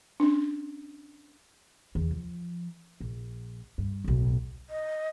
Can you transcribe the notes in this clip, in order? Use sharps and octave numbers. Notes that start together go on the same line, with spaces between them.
C#4 D4
E2 D3
F3
A#1
G2
D1 B1
D#5